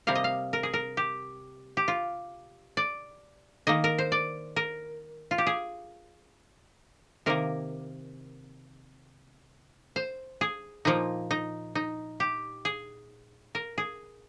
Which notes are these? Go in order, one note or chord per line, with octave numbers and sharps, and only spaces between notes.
C3 G3 A#3 F5
D#5
F5
A#4
G#4
A#4
G4
G4
F4
D5
D#3 A#3 D#5
A#4
C5
D5
A#4
F4
G4
G#4
C3 D#3 A#3 A#4
C5
G#4
A#2 F3 A#3 D#4
D#4
D#4
G4
G#4
A#4
G#4